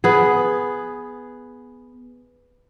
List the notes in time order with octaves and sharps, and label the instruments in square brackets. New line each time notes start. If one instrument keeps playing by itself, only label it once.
[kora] B3 G#4